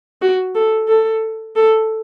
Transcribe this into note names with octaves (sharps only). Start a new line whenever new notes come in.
F#4
A4
A4
A4